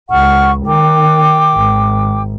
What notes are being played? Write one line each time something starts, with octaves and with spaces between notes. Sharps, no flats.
C#2 F#5 C#6 F6
D#3 G5 D6
G#1